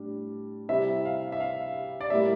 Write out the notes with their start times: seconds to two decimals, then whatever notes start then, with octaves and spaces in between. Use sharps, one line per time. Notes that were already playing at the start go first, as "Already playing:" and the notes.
Already playing: A2 G3 D4
0.69 C3 G3 C4 E4 E5
1.05 F5
1.32 E5
1.40 F5
2.01 D5
2.10 A2 G3 A#3 E4 E5